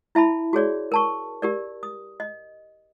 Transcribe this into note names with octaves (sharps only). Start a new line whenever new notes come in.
E4 E5 A5 B5
F#4 G#4 C#5 D5
A#4 A5 C#6
G4 A#4 D5
D#6
D#5